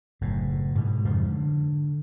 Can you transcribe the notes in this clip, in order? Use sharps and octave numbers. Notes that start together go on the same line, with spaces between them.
F#1 A2
G#2 B2
F2 G#2 C#3 F3
D3